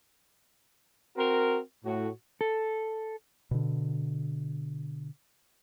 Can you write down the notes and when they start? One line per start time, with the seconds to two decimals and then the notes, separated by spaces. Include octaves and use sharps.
1.16 C4 F#4 A#4
1.85 A2 F#4
2.41 A4
3.51 B2 D3